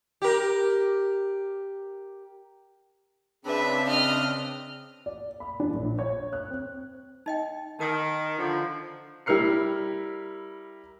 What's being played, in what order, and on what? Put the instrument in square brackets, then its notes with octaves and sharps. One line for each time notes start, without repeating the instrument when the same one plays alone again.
[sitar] G4 A#4
[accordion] C#3 C4 D4 [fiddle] B4 E5
[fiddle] D#5 F6
[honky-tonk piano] D5
B5
D4
A#1
C#5
F#6
C4
[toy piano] D#4 D#5 G5
[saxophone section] D#3 [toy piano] D#4 A#4 D#6
[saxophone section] D3 F3
[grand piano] G3 E4 A#4 F6 C7 C#7